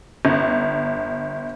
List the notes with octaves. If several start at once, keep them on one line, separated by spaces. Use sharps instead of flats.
G1